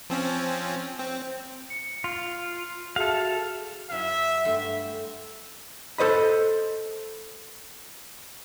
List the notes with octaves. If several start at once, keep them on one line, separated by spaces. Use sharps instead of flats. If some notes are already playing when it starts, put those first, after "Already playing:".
F3 C4 C#4
C4
C#7
F4
F#4 G#4 A4 E5 F5
F#2 F#3 E4 E5
G2 A3 C6
A4 C5 D#5 B5